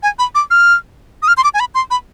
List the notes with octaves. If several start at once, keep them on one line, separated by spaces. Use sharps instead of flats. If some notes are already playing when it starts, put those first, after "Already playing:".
G#5
B5
D6
F6
D#6
F6
C6
D6
G#5
B5
C6
B5